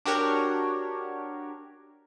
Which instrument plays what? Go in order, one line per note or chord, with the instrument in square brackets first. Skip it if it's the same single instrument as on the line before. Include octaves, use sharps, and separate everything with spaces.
[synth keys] D4 F#4 G4 A#4 C#5